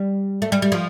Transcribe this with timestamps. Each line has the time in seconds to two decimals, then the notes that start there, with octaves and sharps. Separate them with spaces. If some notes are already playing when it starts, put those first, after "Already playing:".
Already playing: G3
0.42 A3
0.52 G3
0.62 G3
0.72 F3